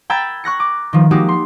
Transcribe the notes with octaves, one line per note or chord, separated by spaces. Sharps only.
G5 A#5 B5 E6 G#6 A6
C#6 F#6 A#6 C#7
D6
D#3 F3
F3 G#3 A#3 D#4 F#4 G4
C6